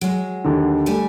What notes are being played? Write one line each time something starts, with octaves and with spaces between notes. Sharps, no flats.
F#3 G#3
D#2 D3
G3 A3 G#5